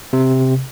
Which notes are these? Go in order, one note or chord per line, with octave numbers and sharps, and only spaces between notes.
C3